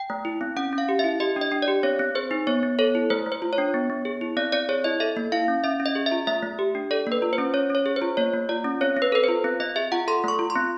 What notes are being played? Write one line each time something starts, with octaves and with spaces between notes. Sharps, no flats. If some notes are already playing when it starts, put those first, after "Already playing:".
Already playing: G5
A3
E4
C4
C#4 F#5
C#4
F5
G4
E4 E5
G4 D#5
D4
D#5
D4
D5
G4
C4 C#5
C4
G#4 C5
D#4
B3 C#5
B3
A4 C#5
E4
A3 C5
A3
C5
F4
C#5
D4
B3
B3
G#4
E4
C4 D5
C4 D5
G#4 C#5
E4 D#5
A4 E5
A#3
E4 F5
C#4
C#4 E5
C#4
D#5
G#4
E5
F4
A3 E5
A3
G4
D4
A4 D5
A#3
B4
F4
C5
C#4
C#4 C#5
C#4 C#5
G#4
C5
F4
A#3 C#5
A#3
F4 D5
C#4
C4 C#5
C4
B4
A4 B4
F4 C5
C4
C4 D#5
G#4 E5
F4 F#5
A4 C6
A3 C#6
F4
C6
C4